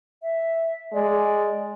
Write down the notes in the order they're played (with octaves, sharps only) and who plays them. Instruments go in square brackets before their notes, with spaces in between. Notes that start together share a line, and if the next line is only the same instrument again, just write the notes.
[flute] E5
[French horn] G#3 [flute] D5